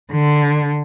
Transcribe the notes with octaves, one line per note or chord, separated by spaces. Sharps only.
D3